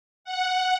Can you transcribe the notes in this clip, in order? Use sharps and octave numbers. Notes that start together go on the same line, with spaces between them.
F#5